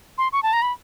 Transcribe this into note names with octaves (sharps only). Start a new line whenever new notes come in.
C6
C#6
A5
A#5
B5